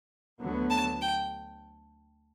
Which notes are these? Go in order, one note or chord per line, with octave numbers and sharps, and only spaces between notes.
D2 D3 F#3 B3
A5
G5